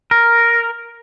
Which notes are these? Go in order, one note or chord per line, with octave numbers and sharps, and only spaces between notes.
A#4